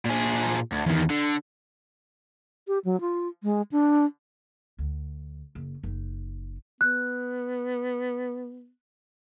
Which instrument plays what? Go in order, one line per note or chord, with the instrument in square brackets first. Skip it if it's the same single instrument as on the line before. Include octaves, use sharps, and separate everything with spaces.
[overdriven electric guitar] A#2 G#4
D2
E2 D#3
D3
[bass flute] G4
F#3
F4
G#3
D4
[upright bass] D2
F#1
F#1 D#4
[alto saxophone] B3 [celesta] F#6